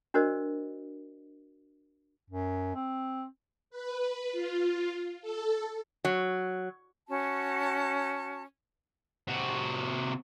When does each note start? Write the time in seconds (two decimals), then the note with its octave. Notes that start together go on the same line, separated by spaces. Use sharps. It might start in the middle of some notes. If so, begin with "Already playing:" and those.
0.14 D4 F#4 A#4 C5 D5 D#5
2.30 F#2
2.75 C4
3.70 B4
4.32 F4
5.22 A4
6.05 F#3
7.08 C#4 F#4 A5
9.28 C3 F#4